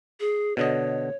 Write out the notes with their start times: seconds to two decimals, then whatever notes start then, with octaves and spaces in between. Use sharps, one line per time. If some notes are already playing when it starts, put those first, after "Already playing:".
0.20 G#4
0.57 B2 D3 C#5 D#5